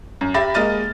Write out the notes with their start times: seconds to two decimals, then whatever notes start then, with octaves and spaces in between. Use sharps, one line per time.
0.21 F#2
0.34 G4 E5 B5 A6 A#6
0.54 G#3 A#3 D#5 F6 A6 D#7